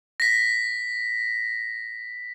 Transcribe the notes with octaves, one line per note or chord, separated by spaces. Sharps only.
A#6 B6